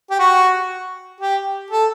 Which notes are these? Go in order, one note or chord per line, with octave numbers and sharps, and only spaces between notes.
G4
F#4
G4
A4